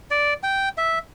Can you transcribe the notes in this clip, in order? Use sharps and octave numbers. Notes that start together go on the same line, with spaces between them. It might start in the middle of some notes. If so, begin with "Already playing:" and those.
D5
G5
E5